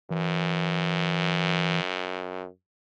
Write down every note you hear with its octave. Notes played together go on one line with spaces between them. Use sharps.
F#2 E3